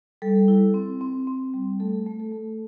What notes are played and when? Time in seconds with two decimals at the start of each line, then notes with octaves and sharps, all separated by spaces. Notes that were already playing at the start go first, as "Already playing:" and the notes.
0.22 G3 A4
0.48 E4
0.74 C4
1.01 C4
1.27 C4
1.54 G3
1.80 A3 A4
2.06 A3
2.20 A4
2.32 A3